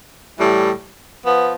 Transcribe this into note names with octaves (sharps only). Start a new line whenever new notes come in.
A2 E3 G3
F3 B3